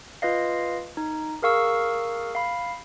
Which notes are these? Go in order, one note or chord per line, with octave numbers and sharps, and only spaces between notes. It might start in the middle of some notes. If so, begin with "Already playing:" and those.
F4 B4 D#5 F5
D#4
G#4 A#4 F5 C#6 E6
F5 B5